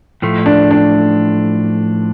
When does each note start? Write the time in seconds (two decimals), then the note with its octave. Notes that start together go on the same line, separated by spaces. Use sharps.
0.22 A2 F3 A3
0.46 D4
0.71 D4